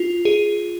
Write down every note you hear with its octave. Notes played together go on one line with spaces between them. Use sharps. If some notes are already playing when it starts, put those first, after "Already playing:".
Already playing: F4
G#4